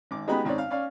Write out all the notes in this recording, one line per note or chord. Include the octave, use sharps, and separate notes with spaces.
G#1 D6
G#3 B3 D#4 F#4 G4 B5
G#1 G#2 C4 C#5 D5
F5
C#4 D5 F5